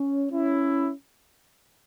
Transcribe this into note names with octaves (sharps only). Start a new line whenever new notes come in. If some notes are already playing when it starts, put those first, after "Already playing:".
Already playing: C#4
C#4 E4